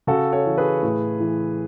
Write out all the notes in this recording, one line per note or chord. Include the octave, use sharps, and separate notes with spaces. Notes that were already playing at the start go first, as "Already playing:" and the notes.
C#3 F#4 A4
A4 C#5
E3
G#4 B4
A2
E3